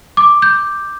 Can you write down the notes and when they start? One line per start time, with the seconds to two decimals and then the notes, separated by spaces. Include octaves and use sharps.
0.17 D6
0.42 G6